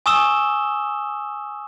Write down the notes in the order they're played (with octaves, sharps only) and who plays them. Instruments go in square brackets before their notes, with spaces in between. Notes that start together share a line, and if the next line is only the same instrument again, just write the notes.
[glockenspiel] G#5 C#6 D#6 E6 E7 G7